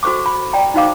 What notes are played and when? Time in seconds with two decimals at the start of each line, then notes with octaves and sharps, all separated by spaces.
0.03 F#4 A4 C5 C#6 D6
0.26 B5
0.53 D5 G5 A#5
0.74 D#4 F#4 C5 F5 D6